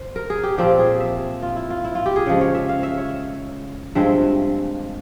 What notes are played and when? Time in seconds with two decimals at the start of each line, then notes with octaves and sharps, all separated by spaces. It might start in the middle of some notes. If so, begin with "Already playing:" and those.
Already playing: C5
0.16 A#4
0.30 G#4
0.43 G4
0.58 A#2 F3 C4 G4
0.79 G#4
1.00 E5
1.42 F4
1.56 E4
1.70 F4
1.84 E4
1.95 F4
2.06 G4
2.16 G#4
2.26 C#3 F3 G#3
2.41 C#5
2.55 E5
2.69 F5
2.83 E5
2.97 C#5
3.95 G2 F3 G#3 C4 E5